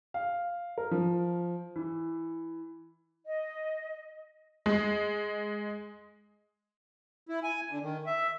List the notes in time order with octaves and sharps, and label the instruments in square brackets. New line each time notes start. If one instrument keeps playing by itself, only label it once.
[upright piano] F5
A#4
F3
E3
[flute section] D#5
[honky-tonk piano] G#3
[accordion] E4
G#5
D3
D#3
E5